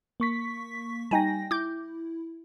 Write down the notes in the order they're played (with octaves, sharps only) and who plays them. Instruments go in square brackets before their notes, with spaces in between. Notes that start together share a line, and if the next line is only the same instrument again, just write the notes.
[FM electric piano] A#3 C#6 B6
[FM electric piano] G3 G5 A#6 [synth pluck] D#4 G#5
[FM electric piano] E4 [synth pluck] D6 G6